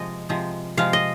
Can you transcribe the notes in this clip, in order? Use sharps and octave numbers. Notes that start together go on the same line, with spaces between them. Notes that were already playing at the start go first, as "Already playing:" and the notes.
Already playing: C3 F3 G#3 D#5
C3 F3 G#3
C3 F3 G#3 F5
D#5